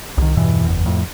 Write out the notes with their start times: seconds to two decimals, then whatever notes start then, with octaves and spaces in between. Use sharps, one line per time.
0.18 C2 D#3
0.37 E2 G2 B2 E3
0.65 F#1 E2
0.86 F2 A2